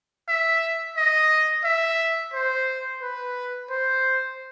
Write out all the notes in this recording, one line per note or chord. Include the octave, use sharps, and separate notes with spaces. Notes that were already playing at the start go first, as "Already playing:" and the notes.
E5
D#5
E5
C5
B4
C5